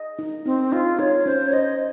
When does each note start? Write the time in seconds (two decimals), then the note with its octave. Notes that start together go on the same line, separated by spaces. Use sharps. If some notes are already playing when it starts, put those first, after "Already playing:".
Already playing: D#5
0.19 D#4
0.45 C4 D#4
0.72 D#4 F4
0.99 D#4 C#5
1.26 C#4 C5
1.47 C#5
1.53 C5 D#5